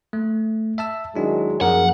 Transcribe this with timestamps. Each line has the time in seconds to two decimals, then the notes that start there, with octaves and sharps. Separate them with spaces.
0.13 A3
0.78 E5 A5 E6
1.16 D#3 F#3 G#3 D4 E4
1.61 F#2 F3 F#3 A#3 G#4 A#4 F#5